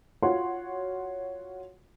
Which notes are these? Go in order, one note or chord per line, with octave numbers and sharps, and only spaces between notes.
F4 F#4 C#5 F#5 C6